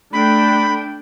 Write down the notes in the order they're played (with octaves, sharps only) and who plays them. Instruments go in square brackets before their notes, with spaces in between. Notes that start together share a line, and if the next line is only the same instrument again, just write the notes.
[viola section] A3 D4 G5 [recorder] B5